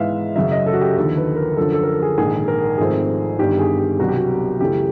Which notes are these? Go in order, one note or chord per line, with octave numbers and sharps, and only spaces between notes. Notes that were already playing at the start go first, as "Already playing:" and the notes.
Already playing: G#2 E3 G#3 B3 E5 F5
F#2 C#3 F#3 E5
D#5
A4
F#4
G4
D#2 D3 F3 A4
B4
A#4
F#2 D3 F3 A4
A4
A#4
A4
G#4
A#1 G#2 D#3 G#4
A#4
G#1 G#2 F3 A3 C4 G#4
G1 G2 D#3 G4
G#4
G4
C2 B2 F#3 F#4
G4
F#4
F#2 C#3 E3 A3 C#4 G4